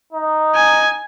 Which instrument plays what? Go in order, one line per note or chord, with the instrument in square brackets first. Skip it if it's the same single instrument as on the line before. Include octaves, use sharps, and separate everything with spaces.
[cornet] D#4
[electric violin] G#5